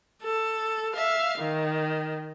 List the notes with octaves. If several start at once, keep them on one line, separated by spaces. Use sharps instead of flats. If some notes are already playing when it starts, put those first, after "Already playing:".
A4
E5 F5
D#3